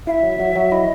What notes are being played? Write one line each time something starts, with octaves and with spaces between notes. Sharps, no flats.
E4 E5 F5
F#3
F#3
F#3
E4 D#5